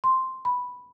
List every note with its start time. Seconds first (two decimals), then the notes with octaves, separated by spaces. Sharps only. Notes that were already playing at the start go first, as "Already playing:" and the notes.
0.04 C6
0.45 B5